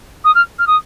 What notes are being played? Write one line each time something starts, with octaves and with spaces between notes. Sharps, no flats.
D#6
F6
F6
D#6